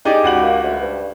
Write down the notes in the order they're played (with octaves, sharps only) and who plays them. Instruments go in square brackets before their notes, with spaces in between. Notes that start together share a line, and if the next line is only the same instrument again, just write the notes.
[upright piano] D#4 G#4 D5 [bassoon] G4
[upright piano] C#2 F#4 F#7
[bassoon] A#3
D2
G2